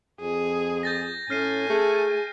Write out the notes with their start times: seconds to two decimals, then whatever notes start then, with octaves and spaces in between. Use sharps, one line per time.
0.20 F2 G#4
0.83 G6 A6 A#6
1.30 A2 C#4 G#5 F6 C7 D#7
1.69 A3 G#4